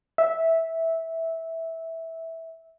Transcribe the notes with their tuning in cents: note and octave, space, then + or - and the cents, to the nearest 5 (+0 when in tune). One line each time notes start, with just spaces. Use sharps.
E5 -10